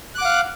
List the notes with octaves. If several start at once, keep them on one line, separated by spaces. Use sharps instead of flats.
F5 F#5 D6 F#6